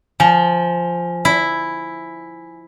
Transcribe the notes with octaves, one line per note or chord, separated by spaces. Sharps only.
F3 G#5
E4